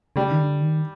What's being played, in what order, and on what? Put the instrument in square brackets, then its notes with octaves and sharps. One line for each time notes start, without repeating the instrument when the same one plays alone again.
[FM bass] C#3 [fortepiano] G3
[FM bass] D#3
D3
D#3